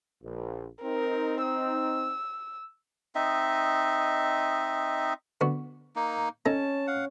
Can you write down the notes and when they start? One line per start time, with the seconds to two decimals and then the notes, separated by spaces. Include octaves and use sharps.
0.22 A#1
0.83 C4 D#4 A#4
1.42 E6
3.15 C4 D#4 D#5 E5
5.41 D3 B3 F#4
5.96 A#3 D#4
6.46 C#4 D#4 A4 A5 A#5
6.87 F5 F#5